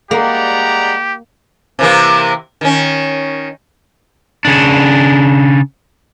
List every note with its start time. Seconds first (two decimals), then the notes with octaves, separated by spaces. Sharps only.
0.11 G3 G#3 A#3 G4 D5 F#5 A#5
1.79 C3 E3 A#3
2.61 D#3 C#4
4.45 C#3 D4